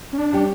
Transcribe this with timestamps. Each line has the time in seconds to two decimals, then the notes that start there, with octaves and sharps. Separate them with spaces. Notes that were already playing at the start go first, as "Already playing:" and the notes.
0.13 C#4
0.18 D4
0.33 G3 C#4 G4